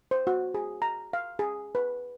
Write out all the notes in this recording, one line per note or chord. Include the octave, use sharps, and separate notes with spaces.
C5
F#4
G#4
A#5
F5
G#4
B4